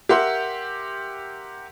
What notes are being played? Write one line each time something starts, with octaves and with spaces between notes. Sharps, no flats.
G4 A#4 E5 F#5 C6